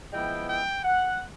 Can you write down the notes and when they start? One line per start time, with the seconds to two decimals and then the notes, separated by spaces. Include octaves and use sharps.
0.12 F3 G#3 B3 E4 G5
0.49 G5
0.84 F#5